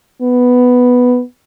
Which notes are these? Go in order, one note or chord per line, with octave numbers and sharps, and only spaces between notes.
B3